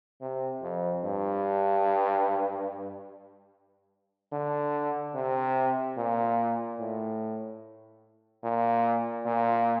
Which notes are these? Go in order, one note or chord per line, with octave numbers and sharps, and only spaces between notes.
C3
F2
G2
D3
C3
A#2
A2
A#2
A#2